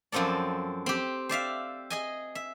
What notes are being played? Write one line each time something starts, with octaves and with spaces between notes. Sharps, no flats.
F#2 F3 C4 A4 D5
C4 G4
C5 D5 E5 F5
G#4 D#5 G#5
E5